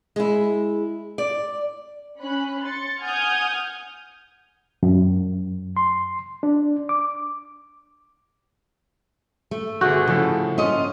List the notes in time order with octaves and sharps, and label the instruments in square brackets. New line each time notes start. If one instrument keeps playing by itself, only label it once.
[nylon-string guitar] G#3 E4
D5
[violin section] C#4 B5 F#6
C6 A6 C#7
F#5 G#5 D#6 F6 G6 G#6
[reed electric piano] F#2
C6
D4
D6
[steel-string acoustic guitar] A3
[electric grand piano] G1 G#4 G6 [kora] F#4
[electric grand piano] A2 F3 A4 [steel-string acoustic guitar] C#3
[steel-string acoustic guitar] C#4 F4 D#5